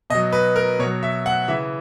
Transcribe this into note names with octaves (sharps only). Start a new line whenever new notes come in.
B2 F#3 D#5
B4
A#4
B2 F#3 C#5
E5
F#5
C#3 E3 E5